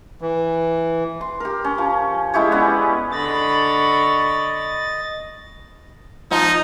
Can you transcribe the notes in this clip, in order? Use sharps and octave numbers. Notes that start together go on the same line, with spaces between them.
E3
C6
G4 A#4
C#4
F3
G#3 E4 G4 C#5
B3 C#4 B4 D5
D3 D#5 B5 C#6 A6
F3 D#4